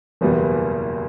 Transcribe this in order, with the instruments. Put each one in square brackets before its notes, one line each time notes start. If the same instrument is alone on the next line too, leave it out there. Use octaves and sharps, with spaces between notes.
[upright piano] F#1 E2 B2 G3 B3